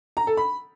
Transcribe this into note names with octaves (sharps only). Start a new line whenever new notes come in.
A#5
A4
B5